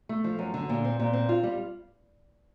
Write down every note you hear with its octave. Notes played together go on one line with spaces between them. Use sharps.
A3
F3
F#2
D3
A#2
C4
A#2
C4
F4
G3